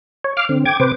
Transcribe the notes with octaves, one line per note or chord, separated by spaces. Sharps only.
C#5
F5 D6 F6
D3 C4
G5 D6 G#6
C3 B4 C5 D6